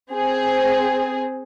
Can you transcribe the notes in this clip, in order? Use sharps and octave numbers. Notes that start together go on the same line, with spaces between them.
C4 G#4